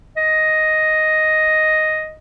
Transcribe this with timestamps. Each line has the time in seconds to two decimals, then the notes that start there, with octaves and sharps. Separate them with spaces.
0.17 D#5